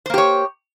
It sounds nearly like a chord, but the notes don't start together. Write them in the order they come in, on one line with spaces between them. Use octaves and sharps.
C5 A#3 G4 C#5